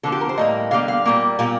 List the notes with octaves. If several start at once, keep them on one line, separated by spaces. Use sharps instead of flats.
D3 F3 A#3 A4
G4
A#4
C5
A2 G3 A#3 D#5
D3 G3 A#3 F5
F5
A#2 G3 A#3
A#2 G3 A#3